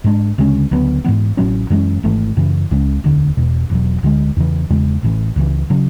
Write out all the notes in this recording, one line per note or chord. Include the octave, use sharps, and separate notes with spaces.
G#2 G#3 D4
D2 C#3 G#3 C#4
D2 C#3 F#3 B3
G#2 E3 B3
A1 A2 F#3 C#4
F#2 E3 G#3 C#4
G#1 G#2 E3 A3
F#2 C#3 E3
C#2 C#3 G#3 C#4
E1 D2 D3
E1 E2 B2
E1 E2 B2 F#3
D2 D3 G#3
E2 C#3 E3
E2 C#3 G#3
A1 A2 E3
C#2 C#3 E3
C#3 F#3